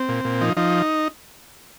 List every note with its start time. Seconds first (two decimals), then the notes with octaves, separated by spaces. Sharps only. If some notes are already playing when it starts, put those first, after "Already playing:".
Already playing: C4
0.09 A#2
0.25 A#2
0.41 F3 D#4
0.57 F3 D#4